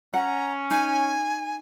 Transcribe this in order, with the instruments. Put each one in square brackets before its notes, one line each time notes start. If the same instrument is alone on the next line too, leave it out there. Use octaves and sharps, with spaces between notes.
[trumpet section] C#4 [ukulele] F#5 [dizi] A#5
[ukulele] D#4 [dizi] G#5